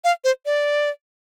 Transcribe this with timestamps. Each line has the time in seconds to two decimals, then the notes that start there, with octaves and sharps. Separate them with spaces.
0.04 F5
0.24 C5
0.46 D5